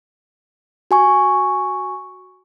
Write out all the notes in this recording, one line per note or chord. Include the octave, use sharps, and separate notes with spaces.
F#4 G#5 C#6